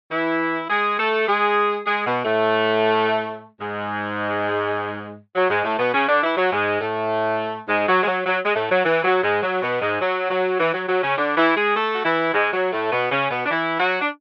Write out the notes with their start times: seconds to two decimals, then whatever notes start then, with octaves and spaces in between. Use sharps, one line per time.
0.12 E3 E4
0.70 G#3 G#4
0.99 A3 A4
1.28 G#3 G#4
1.86 G#3 G#4
2.06 B2 B3
2.25 A2 A3
3.61 G#2 G#3
5.36 F#3
5.50 G#2 G#3
5.64 A2 A3
5.79 B2 B3
5.94 C#3 C#4
6.09 D3 D4
6.23 E3 E4
6.37 F#3
6.52 G#2 G#3
6.81 A2 A3
7.69 G#2 G#3
7.88 F#3
8.02 G#3
8.08 F#3
8.26 F#3
8.45 G#3
8.56 A2 A3
8.71 F#3
8.85 E3
9.04 F#3
9.24 G#2 G#3
9.43 F#3
9.62 B2 B3
9.82 G#2 G#3
10.02 F#3
10.31 F#3
10.60 E3
10.74 F#3
10.89 F#3
11.03 C#3 C#4
11.18 D3 D4
11.37 E3 E4
11.57 G#3 G#4
11.76 A3 A4
11.94 F#4
12.05 E3 E4
12.34 G#2 G#3
12.53 F#3
12.73 A2 A3
12.92 B2 B3
13.12 C#3 C#4
13.31 B2 B3
13.46 D4
13.51 E3 E4
13.80 F#3 F#4
14.01 D4